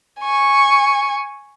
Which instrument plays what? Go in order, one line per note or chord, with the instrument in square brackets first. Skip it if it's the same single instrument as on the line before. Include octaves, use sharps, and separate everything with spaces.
[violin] G#5 C#6